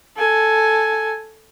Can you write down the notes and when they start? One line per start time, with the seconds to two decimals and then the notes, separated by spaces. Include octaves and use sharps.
0.17 A4 G#5